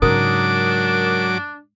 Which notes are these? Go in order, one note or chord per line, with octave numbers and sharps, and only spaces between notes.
G#2 C#3 F#3 D4 A#4 D6 D#6